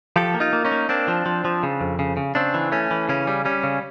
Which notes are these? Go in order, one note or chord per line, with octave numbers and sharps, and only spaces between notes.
F3 G4 A4
A#3
D#4 F4
A#3
C#4 D#4
A#3
A#3 C4 D4
F3
F3
F3
C#3
F2
C#3
C#3
C#3 C4 D4
E3
A3 C#4
E3
C#3 C#4
G3
G3 C#4
C#3